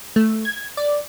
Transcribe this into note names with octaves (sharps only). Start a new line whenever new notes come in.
A3
G#6
D5